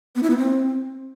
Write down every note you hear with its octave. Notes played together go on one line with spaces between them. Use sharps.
B3
E4
B3
C4